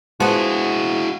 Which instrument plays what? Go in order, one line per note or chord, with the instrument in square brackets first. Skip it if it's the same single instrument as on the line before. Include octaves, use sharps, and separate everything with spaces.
[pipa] F3 B3 [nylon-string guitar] G#3 [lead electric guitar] E4 F#4